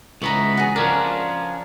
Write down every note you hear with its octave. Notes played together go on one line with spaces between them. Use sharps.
C#2 E3 B3 C#5 E5 A#5
F#4 G#4
F3 C#4 D4 A#4